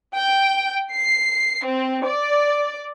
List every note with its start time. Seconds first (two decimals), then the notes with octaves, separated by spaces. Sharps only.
0.15 G5
0.92 C7
1.65 C4
2.05 D5